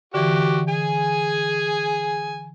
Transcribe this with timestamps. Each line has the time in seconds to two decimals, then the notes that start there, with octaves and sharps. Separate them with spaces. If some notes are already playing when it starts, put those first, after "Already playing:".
0.14 D3 E3 F#4 G4
0.68 G#4 G#5